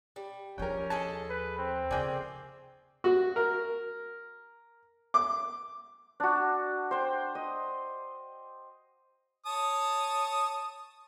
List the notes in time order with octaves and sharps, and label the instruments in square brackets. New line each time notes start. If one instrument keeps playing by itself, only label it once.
[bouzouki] G3
[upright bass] D#2 F3 [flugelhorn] C#4 [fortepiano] A#4 G5
[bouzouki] G#4 A4 D#5 [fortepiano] A5
[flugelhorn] B4
C4
[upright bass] C#3 [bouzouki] A3 A#3 G#4 [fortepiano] D5 G5
[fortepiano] F#4
A#4
D6
[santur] D4 F#4
C5 G5
D#5
[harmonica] C#5 A5 D#6